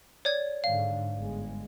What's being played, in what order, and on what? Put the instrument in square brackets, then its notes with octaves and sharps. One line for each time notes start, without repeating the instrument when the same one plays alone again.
[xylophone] C#5 D5 G#6
[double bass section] G#2 D3 [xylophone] F5
[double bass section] G1 G#3